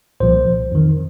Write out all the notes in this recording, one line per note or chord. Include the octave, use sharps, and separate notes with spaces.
C2 A#2 F3 C5
F2 D#3